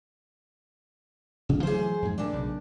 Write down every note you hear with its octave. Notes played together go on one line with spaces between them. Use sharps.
A1 C#3
E3 F#3 A3 G#4 C5
F2 G#2
G2 A#2 D#3 A3 D4
B1 C#3